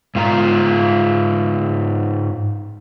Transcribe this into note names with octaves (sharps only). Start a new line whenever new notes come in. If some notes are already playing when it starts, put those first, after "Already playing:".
G#2 F4 A#5